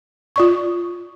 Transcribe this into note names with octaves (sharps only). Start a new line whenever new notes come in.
F4 D5 C#6